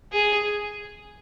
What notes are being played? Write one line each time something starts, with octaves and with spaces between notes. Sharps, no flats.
G#4